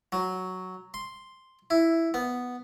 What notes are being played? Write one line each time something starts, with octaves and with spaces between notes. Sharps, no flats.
F#3
C6
E4
B3